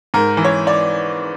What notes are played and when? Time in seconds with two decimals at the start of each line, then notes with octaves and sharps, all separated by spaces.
0.14 G#2 A#4
0.37 E3
0.45 C#5
0.67 D5